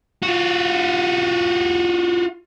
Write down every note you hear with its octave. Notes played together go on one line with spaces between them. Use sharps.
F4 F#4